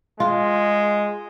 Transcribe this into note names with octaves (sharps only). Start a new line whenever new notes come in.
G#3 F4